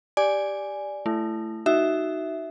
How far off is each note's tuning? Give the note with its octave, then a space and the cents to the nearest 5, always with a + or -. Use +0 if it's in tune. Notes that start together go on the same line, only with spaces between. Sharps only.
G4 +5 D5 +0 G#5 +0
A3 +0 E4 +20
D#4 +0 F#4 +15 E5 +0